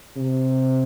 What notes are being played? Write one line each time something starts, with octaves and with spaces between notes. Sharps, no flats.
C3